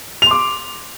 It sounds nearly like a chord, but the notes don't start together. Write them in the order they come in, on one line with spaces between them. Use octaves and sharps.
F7 C6 D6